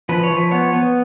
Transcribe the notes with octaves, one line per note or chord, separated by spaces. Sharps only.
F3 B4
C#5
F3
B4
B3 C#5
B3